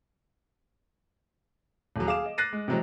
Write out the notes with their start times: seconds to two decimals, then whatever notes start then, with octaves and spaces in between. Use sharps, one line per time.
1.96 D#1 F#3
2.07 G#4 F5 D6 E7
2.26 D#5
2.38 F#6 A6 A#6 C7 D#7
2.53 G#3
2.68 C3 E3 F#3 G#3 C4